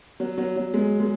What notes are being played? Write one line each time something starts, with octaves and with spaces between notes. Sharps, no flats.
F#3
F#3
F#3
G#3
G#3